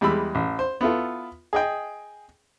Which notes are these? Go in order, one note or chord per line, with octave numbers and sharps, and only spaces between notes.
E2 G3 G#3 B5 E6
A1
C5
B3 E4 F4 A4
G#4 D#5 G5